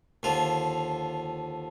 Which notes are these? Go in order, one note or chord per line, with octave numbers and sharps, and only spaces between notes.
D#2 D3 F3 F4